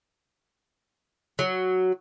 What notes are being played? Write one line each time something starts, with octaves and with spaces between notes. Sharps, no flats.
F#3